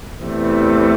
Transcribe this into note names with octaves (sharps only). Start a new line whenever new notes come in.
E2 C3 E3 A3